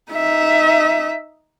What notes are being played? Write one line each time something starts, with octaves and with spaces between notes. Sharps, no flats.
D#4 E5